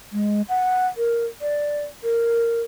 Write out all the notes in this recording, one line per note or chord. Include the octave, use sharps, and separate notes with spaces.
G#3
F#5
A#4
D5
A#4